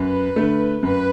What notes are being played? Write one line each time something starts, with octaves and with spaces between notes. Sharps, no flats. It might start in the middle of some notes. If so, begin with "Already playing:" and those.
Already playing: F#2 B4
D3 A3
F#2 B4